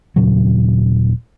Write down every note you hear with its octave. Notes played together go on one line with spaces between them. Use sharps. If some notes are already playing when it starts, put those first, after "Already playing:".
D#1 A#2 C#3 F#3